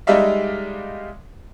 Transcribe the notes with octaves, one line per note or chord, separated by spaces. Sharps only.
G3 G#3 D#4 D5 E5 F5